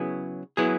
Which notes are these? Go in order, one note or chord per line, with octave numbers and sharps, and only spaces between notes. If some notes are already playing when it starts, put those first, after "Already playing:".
Already playing: C#3 F#3 B3 E4 G#4
F#3 B3 E4 G#4